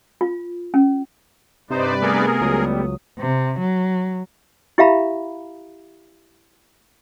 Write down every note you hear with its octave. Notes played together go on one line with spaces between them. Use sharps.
F4
C#4
G2 C3 D#4 B4 C5 D5
A3 B3 G#4 A#4
C#2 F#3 G3 D#6
C3
F#3
E4 G4 E5 F5 A#5 B5